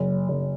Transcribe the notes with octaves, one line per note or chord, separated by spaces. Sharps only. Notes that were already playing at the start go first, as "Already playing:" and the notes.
Already playing: F#1
F#1